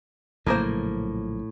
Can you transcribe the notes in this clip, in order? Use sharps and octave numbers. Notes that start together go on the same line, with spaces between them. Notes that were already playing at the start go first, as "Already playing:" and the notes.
A#1 A2 C#3 F3 F#3 A#3 C5